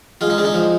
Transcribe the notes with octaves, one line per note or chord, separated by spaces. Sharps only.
G#3 F4
D#4
G#3 D4
D#4
F3